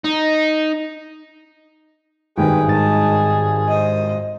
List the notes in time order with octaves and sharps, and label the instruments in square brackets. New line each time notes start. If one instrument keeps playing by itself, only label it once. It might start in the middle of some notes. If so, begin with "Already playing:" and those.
[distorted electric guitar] D#4
[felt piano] G#1 G2 D#3 [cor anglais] G#4 [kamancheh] B4 G5
[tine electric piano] G#2 A6 [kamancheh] D#5 A5
[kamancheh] C5 D#5